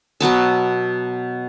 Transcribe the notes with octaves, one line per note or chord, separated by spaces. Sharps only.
B2 F#3 B3 A5